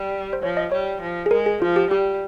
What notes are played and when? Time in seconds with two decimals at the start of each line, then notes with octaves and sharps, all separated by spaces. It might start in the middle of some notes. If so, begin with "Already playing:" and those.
Already playing: G3
0.33 C5
0.42 F3 C#5
0.57 D#5
0.72 G3 C#5
1.01 F3
1.26 G#4
1.31 G#3 A#4
1.46 G#4
1.62 F3 F4
1.76 G4
1.91 G3 G4